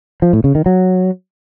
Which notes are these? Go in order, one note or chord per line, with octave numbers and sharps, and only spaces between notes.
F3
A2
C#3
D#3
F#3